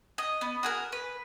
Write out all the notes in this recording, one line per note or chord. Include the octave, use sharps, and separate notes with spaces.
D#5
B3
F#4 G#4 A#4
B4